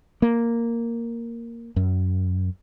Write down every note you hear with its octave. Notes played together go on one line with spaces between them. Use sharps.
A#3
F#2